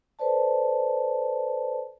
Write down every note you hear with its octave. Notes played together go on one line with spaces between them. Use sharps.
A4 B4 C5 D5 A5